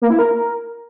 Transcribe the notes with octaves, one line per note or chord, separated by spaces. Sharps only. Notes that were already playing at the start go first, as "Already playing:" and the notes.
A#3
E4
A#4